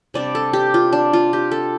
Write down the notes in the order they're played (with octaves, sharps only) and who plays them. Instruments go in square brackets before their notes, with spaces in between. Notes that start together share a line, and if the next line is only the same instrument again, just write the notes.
[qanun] C3 G3 D4 D5
A4
G4
F4
D4
F4
G4
A4